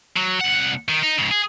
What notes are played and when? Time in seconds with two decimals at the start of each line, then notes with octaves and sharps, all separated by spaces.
0.16 F#3
0.40 C2 F#5
0.89 D#3
1.03 D#4
1.18 G#2 C#3
1.31 G#4